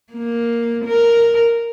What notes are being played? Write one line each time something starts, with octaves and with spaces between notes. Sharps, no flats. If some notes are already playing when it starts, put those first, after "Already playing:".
A#3
A#4